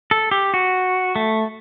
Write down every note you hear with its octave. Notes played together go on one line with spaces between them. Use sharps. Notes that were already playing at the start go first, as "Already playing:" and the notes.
A4
G4
F#4
A3